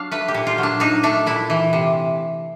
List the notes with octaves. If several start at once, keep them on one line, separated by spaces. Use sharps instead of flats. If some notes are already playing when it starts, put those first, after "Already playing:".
Already playing: F#3 D4 F5
A3 B4
G4
A#2
F4
F#3
D4
D4 D#4
A3 D4
A#2 E4
E3
C3